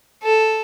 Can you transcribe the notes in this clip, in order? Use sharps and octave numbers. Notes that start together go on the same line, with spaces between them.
A4